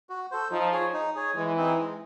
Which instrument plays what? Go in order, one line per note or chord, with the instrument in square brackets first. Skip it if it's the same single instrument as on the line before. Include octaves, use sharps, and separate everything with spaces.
[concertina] F#4
A4 C5
[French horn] F3 [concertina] D#4
[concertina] G#4 C#5
D#4
G#4 C#5
[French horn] E3 [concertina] G#3
[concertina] C4 D#4 G#4
G#3